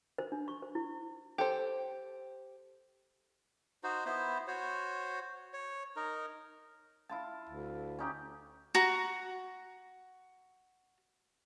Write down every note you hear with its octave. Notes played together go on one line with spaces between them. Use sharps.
C5
D4
C#6
C5
E4
G4 A4 C5
D#4 F#4 C5
B3 E4 C5
F#4 C5 C#5
C#5
D#4 A#4
E4 F4 A5
D2
C#4 D#4 G4
F#4 A#5